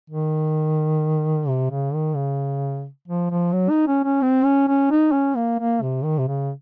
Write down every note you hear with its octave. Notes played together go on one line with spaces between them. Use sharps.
D#3
C3
C#3
D#3
C#3
F3
F3
F#3
D#4
C#4
C#4
C4
C#4
C#4
D#4
C#4
A#3
A#3
C3
D#3
C3
C#3